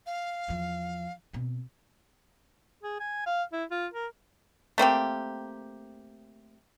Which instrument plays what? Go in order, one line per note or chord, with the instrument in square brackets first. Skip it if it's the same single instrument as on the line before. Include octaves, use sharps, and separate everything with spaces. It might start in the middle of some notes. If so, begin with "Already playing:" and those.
[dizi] F5
[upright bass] E2 F3
B2 C4
[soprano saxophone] G#4
G#5
F5
E4
F4
A#4
[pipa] A3 A#3 C4 G4